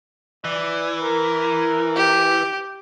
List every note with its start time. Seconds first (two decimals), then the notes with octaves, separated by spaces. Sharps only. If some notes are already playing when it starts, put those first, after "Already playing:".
0.45 E3 D5
1.00 A#4
1.96 G4